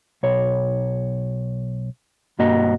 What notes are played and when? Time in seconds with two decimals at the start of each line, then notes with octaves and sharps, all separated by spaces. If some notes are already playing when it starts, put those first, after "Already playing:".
0.23 B1 C#5
2.39 B1 G2 A#3 F#4 D#5